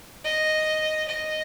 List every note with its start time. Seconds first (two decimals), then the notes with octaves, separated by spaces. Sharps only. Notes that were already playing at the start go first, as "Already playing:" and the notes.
0.24 D#5
1.08 D#5